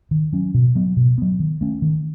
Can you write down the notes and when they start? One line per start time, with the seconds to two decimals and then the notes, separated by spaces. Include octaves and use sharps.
0.11 D#3
0.33 F#3 C#4
0.54 B2
0.75 F#3 B3
0.97 B2
1.18 F#3 B3
1.40 D#3
1.61 A3 C#4
1.82 D#3